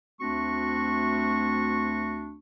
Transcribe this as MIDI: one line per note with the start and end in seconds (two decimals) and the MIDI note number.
0.21 2.37 38
0.21 2.37 57
0.21 2.37 60
0.21 2.37 62
0.21 2.37 66
0.21 2.37 85